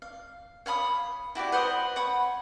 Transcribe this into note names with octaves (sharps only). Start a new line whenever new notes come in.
F5
C#5 F5 B5 D#6
E4 F#4 G4 D5
B4 C5 F#5 D#6
C#5 F#5 B5